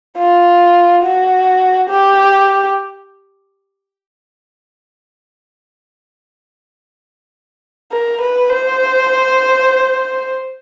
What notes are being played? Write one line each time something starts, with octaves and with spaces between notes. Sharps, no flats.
F4
F#4
G4
A#4
B4
C5